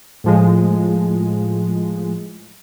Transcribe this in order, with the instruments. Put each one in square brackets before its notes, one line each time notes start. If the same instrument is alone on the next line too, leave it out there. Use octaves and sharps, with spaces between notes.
[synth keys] A2 F3 G#3